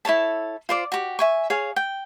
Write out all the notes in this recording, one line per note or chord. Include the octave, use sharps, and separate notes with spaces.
E4 A4 C#5 A5
F4 C5 D5
F#4 G4
E5 G#5 C#6
G#4 C#5 F5
G5